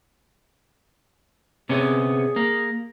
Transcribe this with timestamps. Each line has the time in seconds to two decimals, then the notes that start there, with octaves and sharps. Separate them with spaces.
1.69 C3 B3 C#4 G#4
2.36 A#3